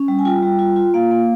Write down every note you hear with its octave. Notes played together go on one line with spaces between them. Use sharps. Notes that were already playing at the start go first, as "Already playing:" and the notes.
Already playing: C#4
G3
G#5
F4 G5
G3
F4
F4
A#3 F5
A#3